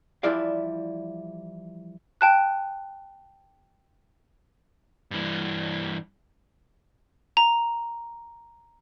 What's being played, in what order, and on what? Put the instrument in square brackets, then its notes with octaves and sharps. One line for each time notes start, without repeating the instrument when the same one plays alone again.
[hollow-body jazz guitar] E3 F3 G3 E4 D5 F5
[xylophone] G5 A5 F#6
[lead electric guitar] G2 E3
[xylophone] A#5